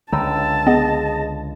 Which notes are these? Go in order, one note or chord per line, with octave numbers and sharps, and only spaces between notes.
C#2 D3 G5 A5 A#5 E6
B3 G#4 D#5 A#6